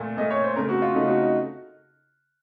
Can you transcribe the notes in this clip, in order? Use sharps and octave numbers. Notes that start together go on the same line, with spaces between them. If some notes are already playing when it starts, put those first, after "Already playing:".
Already playing: A#2 A3 A4
A#2 A3 D#5
C#5
C5
C#3 A3 A#4
F#4
F4
C#3 A3 D#4
F#4
D#4